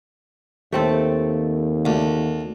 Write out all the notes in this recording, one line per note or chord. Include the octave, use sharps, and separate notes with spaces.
D#2 A3 C4 A4
D2